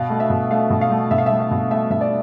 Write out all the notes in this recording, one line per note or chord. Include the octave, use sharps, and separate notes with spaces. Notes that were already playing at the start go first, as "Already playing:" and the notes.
Already playing: B2 F5
A3
E5
B2
A3 F5
B2
F5
A3
B2 E5
F5
E5
A3
E5
B2
A3 E5
B2 E5
D5